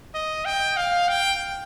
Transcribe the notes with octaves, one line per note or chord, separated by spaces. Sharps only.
D#5
G5
F5
G5